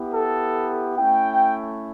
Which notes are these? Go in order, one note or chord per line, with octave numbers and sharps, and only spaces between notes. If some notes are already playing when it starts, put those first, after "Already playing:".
Already playing: B3 E4 G4
A4
A3 C#4 E4 G5